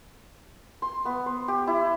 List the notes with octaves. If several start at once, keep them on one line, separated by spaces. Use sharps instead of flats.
C6
B3
C5
G4
E4